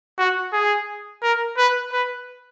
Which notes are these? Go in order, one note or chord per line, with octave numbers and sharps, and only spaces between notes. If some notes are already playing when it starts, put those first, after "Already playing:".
F#4
G#4
A#4
B4
B4